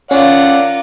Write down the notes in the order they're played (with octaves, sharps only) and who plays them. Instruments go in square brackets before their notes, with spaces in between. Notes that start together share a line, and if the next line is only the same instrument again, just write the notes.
[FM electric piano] C#4 [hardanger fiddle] F4 A#4 [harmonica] D5 F#5